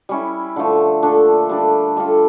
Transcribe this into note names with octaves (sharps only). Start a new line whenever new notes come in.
G3 C#4 E4
D3 F3 A3
A#2 A3 D4 A4
G3 D4 A4
G3 D4 F4 A4